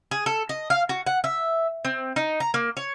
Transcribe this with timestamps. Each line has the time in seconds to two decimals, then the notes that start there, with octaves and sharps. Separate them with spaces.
0.11 G#4
0.26 A4
0.49 D#5
0.70 F5
0.89 F#4
1.07 F#5
1.24 E5
1.85 C4
2.16 D#4
2.40 A#5
2.54 A#3
2.77 C#5